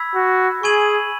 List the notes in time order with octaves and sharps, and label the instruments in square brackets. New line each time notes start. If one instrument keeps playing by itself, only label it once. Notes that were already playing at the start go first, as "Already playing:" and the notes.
Already playing: [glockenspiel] B5 E6 G#6 B6
[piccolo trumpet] F#4
[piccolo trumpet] G#4 [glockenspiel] G#5 C#6 G#6 D#7 F#7